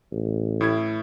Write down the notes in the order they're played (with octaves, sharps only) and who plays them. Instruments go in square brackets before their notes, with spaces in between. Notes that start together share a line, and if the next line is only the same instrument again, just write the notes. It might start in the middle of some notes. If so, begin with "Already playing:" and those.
[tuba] A1
[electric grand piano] A2 E4 G#6